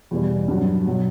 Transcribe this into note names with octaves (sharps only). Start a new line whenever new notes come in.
E2 B2 G3
G2 F#3
B2 F#3